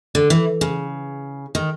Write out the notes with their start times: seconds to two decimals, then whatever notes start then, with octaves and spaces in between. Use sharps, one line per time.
0.15 D3
0.30 E3
0.61 C#3
1.55 D#3